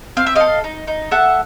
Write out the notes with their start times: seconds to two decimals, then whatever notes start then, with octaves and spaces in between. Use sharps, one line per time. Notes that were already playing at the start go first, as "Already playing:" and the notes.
0.17 C4 F5
0.26 E5
0.35 A4 D#5 F5
0.64 D#4
0.87 D#4
1.11 A4 E5 F#5